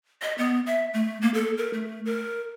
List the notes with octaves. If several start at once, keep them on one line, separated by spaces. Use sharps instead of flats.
D#5
B3
E5
A3
A#3
A4
A#4
A3
A#4